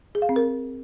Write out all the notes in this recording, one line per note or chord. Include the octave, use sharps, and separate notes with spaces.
G#4
F5
C4
A#4